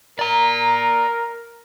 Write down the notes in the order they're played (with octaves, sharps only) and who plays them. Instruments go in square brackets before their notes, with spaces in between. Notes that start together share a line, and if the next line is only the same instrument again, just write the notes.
[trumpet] A#4 [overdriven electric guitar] D5 A#5